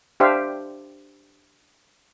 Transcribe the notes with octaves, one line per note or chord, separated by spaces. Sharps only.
D4 G4 C5 E5 F5